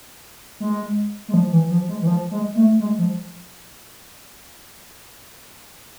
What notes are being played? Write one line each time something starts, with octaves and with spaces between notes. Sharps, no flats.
G#3
G#3
F3
E3
F3
G#3
E3
F3
G#3
A3
G#3
F3